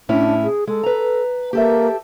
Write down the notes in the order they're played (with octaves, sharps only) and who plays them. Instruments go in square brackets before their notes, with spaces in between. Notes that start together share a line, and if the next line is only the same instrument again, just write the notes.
[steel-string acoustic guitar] A2 C#4 E4 [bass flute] D4
[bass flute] G#4
[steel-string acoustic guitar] G#3 [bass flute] A4
[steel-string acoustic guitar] B4 A#5
[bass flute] A#3 [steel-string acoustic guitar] G4 A4 E5